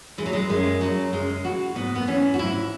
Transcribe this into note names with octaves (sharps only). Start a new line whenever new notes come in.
E3 G#3
F#3
G#3
F#2 G#3
C#3 F#3
F#2 G#3
E3 F#4
G#2 B3
B3
E3 C#4
F#4
G#2 E4